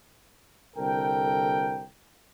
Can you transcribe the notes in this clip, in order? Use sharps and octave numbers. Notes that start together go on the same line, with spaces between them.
C2 D3 A4 A#4 G5